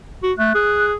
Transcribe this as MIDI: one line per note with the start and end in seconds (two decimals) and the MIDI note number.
0.23 0.32 66
0.38 0.50 57
0.38 0.54 90
0.54 0.95 68
0.54 0.86 90